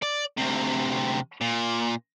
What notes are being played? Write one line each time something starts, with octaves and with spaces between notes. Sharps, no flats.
D5
D2 C3
A#2